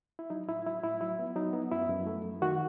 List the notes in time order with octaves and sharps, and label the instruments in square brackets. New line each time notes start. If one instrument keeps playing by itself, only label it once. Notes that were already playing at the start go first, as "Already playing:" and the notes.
[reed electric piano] E4
F#3 D#4
A2 E4
F#3 E4
A2 E4
F#3 E4
B3
F#3 D#4
B3
F#2 E4
F#2
A3
F#2
D#3 F#4